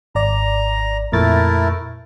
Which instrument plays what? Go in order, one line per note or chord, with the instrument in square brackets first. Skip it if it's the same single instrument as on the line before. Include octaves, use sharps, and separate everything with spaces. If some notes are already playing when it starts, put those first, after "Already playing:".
[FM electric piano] G#1 D5 [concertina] A#5
[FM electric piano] F2 A#2 A6 [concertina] A3 E4 A#4